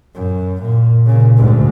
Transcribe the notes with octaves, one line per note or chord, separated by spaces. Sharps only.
F#2
A#2
A#2 C#3
D2 G#2